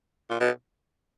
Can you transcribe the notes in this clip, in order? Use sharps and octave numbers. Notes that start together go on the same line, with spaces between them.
A#2
B2